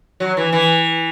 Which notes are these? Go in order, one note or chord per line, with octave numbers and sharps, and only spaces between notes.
F#3
E3
E3